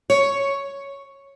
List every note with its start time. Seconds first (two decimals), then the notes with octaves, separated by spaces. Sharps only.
0.10 C#5